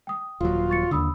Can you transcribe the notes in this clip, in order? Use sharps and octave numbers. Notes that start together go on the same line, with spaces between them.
G5 D#6
D#1 F#3 F4
C#6 A6 C#7
D#2 D3 B5 D#6 E6